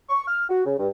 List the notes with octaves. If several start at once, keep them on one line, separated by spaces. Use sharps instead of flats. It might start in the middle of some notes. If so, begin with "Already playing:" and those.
C#6
F6
F#4
C#3
G2